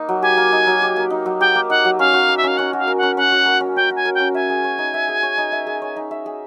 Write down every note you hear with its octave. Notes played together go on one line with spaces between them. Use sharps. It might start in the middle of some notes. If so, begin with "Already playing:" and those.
Already playing: A#3 D#4
F#3
G4 G#5
A#3
D#4
F#3
G4
A#3
D#4
F#3
G4 G5
A#3
D#4 F#5
F#3
C#4 F5
F#4
A#4
E5
C#4 F5
C#4 F#5
F#4
F5
A#4
C#4 F#5
C#4 F#5
F#4
A#4
C#4
C#4 G5
F#4
G#5
A#4
G5
C#4
E5 G#5
G#4
C#5
D#4
E5
G#4
C#5
D#4
E5
G#4
C#5
D#4
E5
G#4